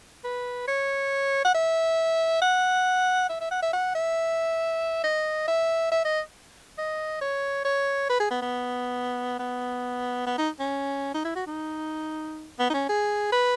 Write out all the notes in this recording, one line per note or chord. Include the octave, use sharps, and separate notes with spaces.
B4
C#5
F#5
E5
F#5
E5
E5
F#5
E5
F#5
E5
D#5
E5
E5
D#5
D#5
C#5
C#5
B4
G#4
B3
B3
B3
B3
D#4
C#4
D#4
E4
F#4
D#4
B3
D#4
C#4
G#4
B4